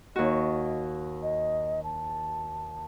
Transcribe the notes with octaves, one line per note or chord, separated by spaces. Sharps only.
D#2 F#4 D#5
D#5
A5